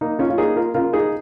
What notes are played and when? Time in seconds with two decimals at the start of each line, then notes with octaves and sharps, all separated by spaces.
0.01 A#3 D#4
0.19 C#4 F4
0.30 F4
0.38 A#3 D#4 G#4
0.56 F4 A#4
0.75 C#3 F4 A#4
0.93 D#4 G#4